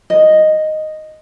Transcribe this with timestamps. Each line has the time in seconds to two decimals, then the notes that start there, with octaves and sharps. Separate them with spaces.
0.10 D#5